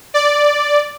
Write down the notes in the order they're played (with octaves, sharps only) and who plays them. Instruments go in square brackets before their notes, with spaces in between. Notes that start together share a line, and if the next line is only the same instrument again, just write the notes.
[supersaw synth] D5